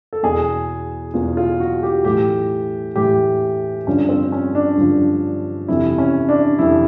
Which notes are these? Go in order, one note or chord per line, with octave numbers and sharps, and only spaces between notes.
A4
E2 B2 G#4
E2 B2 F4
F4
F#4
G4
A2 E3 G4
A2 E3 G4
G2 D3 F3 C#4
C4
C#4
D4
G2 D3 F3
F2 C3 E3 E4
C#4
D4
F2 C3 E3 E4